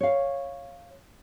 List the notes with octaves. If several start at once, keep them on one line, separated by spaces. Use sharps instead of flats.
C#5 F5